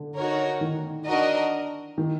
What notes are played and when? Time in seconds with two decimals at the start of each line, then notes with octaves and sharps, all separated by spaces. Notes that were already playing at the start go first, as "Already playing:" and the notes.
Already playing: D3
0.16 D#4 F#4 A#4 C#5
0.61 D#3
1.06 D4 F#4 A#4 D#5
1.98 D#3